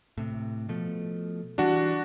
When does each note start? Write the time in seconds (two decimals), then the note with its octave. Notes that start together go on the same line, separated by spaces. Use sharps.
0.18 A2 C3
0.69 B2 F3 A3
1.58 E3 G3 D4 F#4